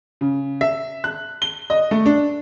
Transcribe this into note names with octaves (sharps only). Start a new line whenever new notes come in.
C#3
E5
F#6
G7
D#5
A3
D4